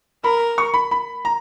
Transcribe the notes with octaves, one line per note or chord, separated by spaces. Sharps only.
A#4 B5
C#6
B5
B5
A#5